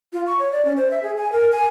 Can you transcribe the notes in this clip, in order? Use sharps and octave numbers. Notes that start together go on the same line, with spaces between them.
F4
C#6
C#5
D5
C#4
C5
E5
G#4
G#5
A#4
G#5